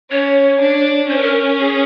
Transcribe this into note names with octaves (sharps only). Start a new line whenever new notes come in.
C#4 C#5
D4
C#4 C5
B4
A#4
G#4